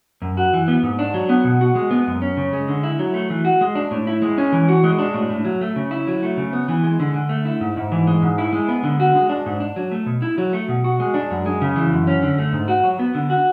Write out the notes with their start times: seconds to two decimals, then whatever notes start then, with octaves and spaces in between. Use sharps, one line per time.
0.22 F#2
0.37 F#4
0.53 E3
0.68 B3
0.83 G#2
0.99 D4
1.14 F#3
1.29 B3
1.44 B2
1.61 F#4
1.75 G#3
1.91 B3
2.07 F#2
2.22 C#4
2.37 C#3
2.53 G#3
2.68 D3
2.83 E4
2.99 F#3
3.14 A3
3.30 E3
3.45 F#4
3.61 G#3
3.75 D4
3.91 A2
4.07 E4
4.22 G#3
4.38 C#4
4.52 E3
4.69 F#4
4.84 G#3
4.99 D4
5.14 A2
5.30 A2
5.45 F#3
5.61 A3
5.76 C#3
5.91 E4
6.07 F#3
6.23 A3
6.37 C#3
6.53 B3
6.68 E3
6.83 G#3
7.00 D3
7.14 D3
7.29 A3
7.45 E4
7.61 G#2
7.77 G#2
7.92 E3
8.07 G#3
8.22 G#2
8.38 E4
8.53 G#3
8.68 B3
8.84 D3
9.00 F#4
9.15 G#3
9.29 D4
9.46 G#2
9.60 D4
9.76 F#3
9.91 A3
10.06 B2
10.22 E4
10.38 F#3
10.53 A3
10.69 B2
10.84 F#4
11.00 G#3
11.14 D4
11.31 F#2
11.46 G#3
11.61 C#3
11.76 E3
11.92 F#2
12.07 C#4
12.23 D3
12.38 A3
12.53 G#2
12.68 F#4
12.84 F#3
12.99 B3
13.15 D3
13.30 F#4